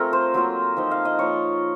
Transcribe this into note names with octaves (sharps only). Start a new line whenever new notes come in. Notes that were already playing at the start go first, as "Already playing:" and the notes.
Already playing: A3 C4 F4 A#4
C5
F#3 A#3 F4
F3 C4 D#4
F5
D#5
F3 A#3 F4 C#5